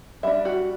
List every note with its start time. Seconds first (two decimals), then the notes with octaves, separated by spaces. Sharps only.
0.23 G3 D4 E5
0.45 F#4